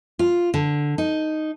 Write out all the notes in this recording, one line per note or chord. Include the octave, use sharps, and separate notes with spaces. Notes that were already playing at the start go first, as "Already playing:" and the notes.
F4
D3
D#4